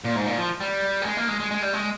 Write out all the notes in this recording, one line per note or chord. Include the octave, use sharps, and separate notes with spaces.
A#2
G#2
A#2
F3
G3
A#3
G#3
A#3
G#3
G#3
G#3
G3
G#3